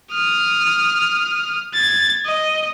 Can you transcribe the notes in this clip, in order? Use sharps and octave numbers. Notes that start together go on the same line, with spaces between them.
D#6 F6
G#6 A6
D#5